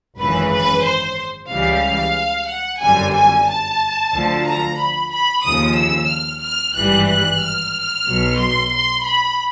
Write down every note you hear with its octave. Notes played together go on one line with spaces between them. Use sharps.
G#1 F#2 C#3 E3 B4
B4
C5
C#2 C#3 E3 G3 F5
F#5
G1 F#2 D3 G3 G#5
G#5
A5
D2 D3 F3
A#5
B5
B5
D#2 C#3 F3 D#6
E6
F6
F6
G#1 G2 E3 G3 F#6
F#6
F6
B1 B2 F#3
C6
C6
B5